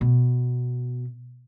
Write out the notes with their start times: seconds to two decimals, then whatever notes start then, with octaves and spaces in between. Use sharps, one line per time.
0.01 B2